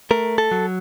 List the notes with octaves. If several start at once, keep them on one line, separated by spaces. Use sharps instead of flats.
A3 A#4
A4
F#3